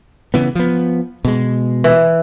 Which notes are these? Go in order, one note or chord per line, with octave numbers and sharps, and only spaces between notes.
C#3 E3 B3
F3 B3
B2 G#3
E3